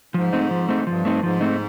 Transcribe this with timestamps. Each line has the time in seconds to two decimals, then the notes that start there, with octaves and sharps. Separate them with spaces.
0.14 G#2 F3
0.33 A3 C4 D#4
0.51 F3
0.69 A3 C4 D#4
0.87 G2 F3
1.05 A3 C4 D#4
1.22 G#2 F3
1.41 A3 C4 D#4